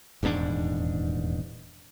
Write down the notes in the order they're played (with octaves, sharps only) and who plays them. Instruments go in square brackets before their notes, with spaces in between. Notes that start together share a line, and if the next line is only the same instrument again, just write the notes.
[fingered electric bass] D#1 E2 G#2 D4